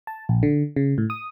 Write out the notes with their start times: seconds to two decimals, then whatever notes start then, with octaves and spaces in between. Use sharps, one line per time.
0.07 A5
0.29 A#1
0.43 D3
0.76 C#3
0.98 A2
1.10 D#6